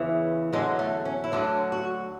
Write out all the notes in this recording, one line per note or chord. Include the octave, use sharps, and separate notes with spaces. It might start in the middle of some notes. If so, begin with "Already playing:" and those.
Already playing: E2 C#3 E3
E2 D3 F#3 G#3
A3
C#4
E4
D2 D3 F#3 D4
F#4